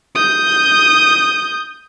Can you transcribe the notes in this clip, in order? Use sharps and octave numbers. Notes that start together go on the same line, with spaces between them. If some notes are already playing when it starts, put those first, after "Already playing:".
D#6 G6